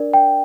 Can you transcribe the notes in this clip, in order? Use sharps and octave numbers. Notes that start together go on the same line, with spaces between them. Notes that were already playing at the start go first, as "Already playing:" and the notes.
Already playing: D4 A#4 D5
G5